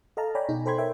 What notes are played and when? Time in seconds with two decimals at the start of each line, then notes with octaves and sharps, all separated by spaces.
0.17 A4 D#5 F5 A5 A#5
0.35 C#5 D5 G5 G#5 A#5 B5
0.49 B2 D#4 G#4
0.66 A4 C5 G5 B5 C6 G#6
0.78 A#4 C#5 E5 G5